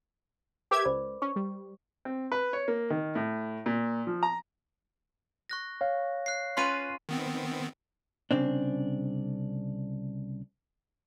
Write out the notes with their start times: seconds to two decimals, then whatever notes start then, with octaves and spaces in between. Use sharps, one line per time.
0.71 G4 A#4 B4 E5 D6 G#6
0.85 C#2 C5 D5 B5
1.22 C#4 C#6
1.36 G3
2.05 C4
2.32 B4
2.53 C#5
2.68 A#3
2.90 D#3
3.15 A2
3.66 A#2
4.07 F3
4.23 A#5
5.50 C#6 F#6 A#6
5.81 C#5 F5
6.26 F#6 C7
6.57 C#4 F4 B4 C6 D#7
7.09 D#3 B3 C4
8.31 C2 F2 C#3 C4 D4